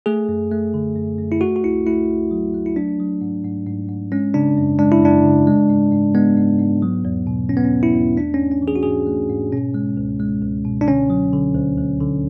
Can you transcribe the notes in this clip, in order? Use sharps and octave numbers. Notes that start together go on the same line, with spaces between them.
A3 G#4
F#2
A3
D3
F#2
F#2
E4
A3 F#4
F#4
C#2 E4
A3 E4
C#2
F#3
A3
E4
F#3 D4
F#3
G#2
G#2
G#2
G#2
G#3 C#4
C#3 D4
F#2
G#3 D4
E4
F#2 D4
C#3
G#3
G#2
G#2
G#3 B3
G#2
G#2
F#3
E2
B2
B2 C#4
B3
C#4
E2
E4
E2
A3 D4
C#4
G#2
C#4
E3
G#4
F#4
G#2 G#4
A3
G#2
B2 C#4
G#3
C#2
G#3
C#2
B2
D4
D3 C#4
F#3
D3
D2
D2
D3